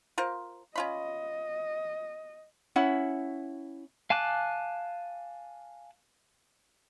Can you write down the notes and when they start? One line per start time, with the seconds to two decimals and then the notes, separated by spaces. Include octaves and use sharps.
0.18 F4 A#4 C5
0.76 C#4 F4 D#5 B5
2.76 C#4 E4 F#5
4.10 F5 G#5 A5 D6 F#6